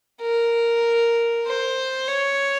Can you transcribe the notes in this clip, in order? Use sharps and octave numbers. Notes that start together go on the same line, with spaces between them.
A#4
C5
C#5